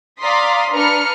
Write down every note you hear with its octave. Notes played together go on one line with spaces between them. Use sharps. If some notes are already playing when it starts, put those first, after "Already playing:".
D5 F5 A#5 C6 D#6 B6
D4 B4 A#5 F6 C#7